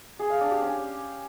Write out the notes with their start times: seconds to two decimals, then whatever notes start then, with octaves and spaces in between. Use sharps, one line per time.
0.19 G#4
0.30 F5
0.40 D4
0.51 G4
0.62 C#4